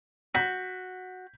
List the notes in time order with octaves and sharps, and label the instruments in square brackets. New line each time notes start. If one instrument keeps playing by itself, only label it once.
[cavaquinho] F#4 [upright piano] G6 B6